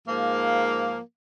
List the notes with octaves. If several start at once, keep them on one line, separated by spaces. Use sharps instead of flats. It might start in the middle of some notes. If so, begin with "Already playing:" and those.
G#2 F3 A#3